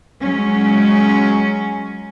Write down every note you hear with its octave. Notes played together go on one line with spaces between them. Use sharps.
F#3 G#3 C#4